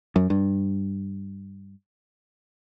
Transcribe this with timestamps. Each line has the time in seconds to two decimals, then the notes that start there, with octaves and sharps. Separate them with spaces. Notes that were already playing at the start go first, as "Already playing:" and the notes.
0.16 F#2
0.30 G2